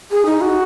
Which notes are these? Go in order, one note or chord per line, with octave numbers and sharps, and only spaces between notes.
G#4
D#4
F#4